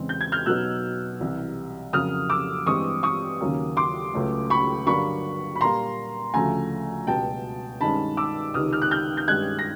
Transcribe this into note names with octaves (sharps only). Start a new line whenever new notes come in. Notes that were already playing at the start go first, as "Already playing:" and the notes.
Already playing: E2 C#3 E3 G#3 C4
G6
G#6
F6 G6
B2 F#3 B3 D#4 E6 F#6
C2 C3 E3
F2 C#3 F#3 A#3 D#6 F6
D6 E6
G2 E3 G#3 C4 C#6 D#6
C#6 D#6
D#2 C#3 F#3 A#3 C#4
C6 D6
C#2 C#3 F#3 A3 C#4
B5 C#6
G2 D3 F#3 A#3 D4 B5 C#6
B5
A#2 G3 A#3 A#5 C6
D2 C#3 F3 A3 G#5 A#5
C#2 B2 G3 G5 A5
G2 D#3 G#3 C#4 A5 B5
D6 E6
C#2 C3 D#3 D#6 F6
F6
F#6
F6 G6
G6
G2 D#3 G#3 C#4 F#6 G#6
A#6